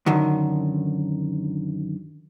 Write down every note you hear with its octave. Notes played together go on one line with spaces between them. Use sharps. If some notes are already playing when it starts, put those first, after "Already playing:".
F#2 D3 D#3